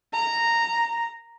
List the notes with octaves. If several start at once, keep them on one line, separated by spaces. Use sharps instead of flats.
A#5